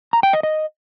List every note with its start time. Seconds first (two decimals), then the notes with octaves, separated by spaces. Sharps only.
0.13 A#5
0.23 G5
0.33 D#5
0.43 D#5